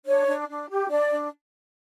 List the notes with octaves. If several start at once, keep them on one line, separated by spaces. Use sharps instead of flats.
D4 C#5
D4
D4
G4
D4 D5
D4